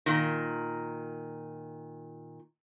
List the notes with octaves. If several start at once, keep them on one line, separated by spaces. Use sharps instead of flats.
A#2 D#3